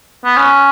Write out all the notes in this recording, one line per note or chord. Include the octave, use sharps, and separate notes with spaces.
B3
C#4